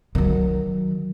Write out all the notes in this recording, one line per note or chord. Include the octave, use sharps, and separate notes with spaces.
D#3 F#3